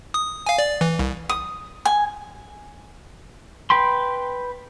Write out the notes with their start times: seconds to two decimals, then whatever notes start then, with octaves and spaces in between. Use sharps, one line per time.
0.14 D#6
0.46 F5 G#5
0.58 D5
0.81 E3
0.99 C2
1.29 D#6
1.85 G#5
3.70 B4 G5 B5 C6